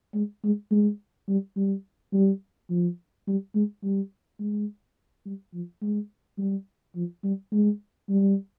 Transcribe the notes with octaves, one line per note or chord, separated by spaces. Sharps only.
G#3
G#3
G#3
G3
G3
G3
F3
G3
G#3
G3
G#3
G3
F3
G#3
G3
F3
G3
G#3
G3